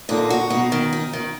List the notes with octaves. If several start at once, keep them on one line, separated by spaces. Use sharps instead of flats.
A#2 D3 D#4
F#4
B2 D#4
D#3
D#4
D#3